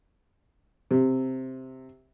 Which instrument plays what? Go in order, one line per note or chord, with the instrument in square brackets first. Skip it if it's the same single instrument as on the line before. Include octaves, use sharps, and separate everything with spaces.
[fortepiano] C3